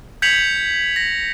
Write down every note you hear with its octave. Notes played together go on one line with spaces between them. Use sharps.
G6 G#6 B6 C#7 F7 F#7
A#6